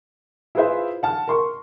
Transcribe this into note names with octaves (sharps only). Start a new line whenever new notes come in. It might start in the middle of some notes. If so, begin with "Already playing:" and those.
E4 F4 G#4 B4 C5 E5
F#5 A5 F6
A#4 C6 C#6